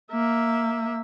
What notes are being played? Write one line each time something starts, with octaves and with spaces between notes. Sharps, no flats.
A#3 E5